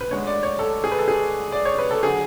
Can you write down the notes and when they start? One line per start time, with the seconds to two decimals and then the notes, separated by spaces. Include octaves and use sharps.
0.01 B4
0.11 D2 D3 G#3 C#5
0.27 D5
0.43 C#5
0.59 A4
0.84 G#4
0.92 B4
0.99 A4
1.08 G#4
1.52 D5
1.65 C#5
1.78 B4
1.91 A4
2.03 D3 F#3 G#4